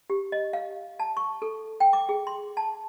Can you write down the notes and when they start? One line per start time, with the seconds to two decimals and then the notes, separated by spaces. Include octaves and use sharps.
0.10 G4
0.32 D#5
0.53 F5
1.00 A5
1.17 C#6
1.42 A4
1.80 G5
1.93 D6
2.09 G#4
2.27 C6
2.57 A5